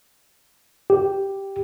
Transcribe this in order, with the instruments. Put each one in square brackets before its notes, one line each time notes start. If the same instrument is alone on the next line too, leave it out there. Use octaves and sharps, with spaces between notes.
[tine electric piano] G4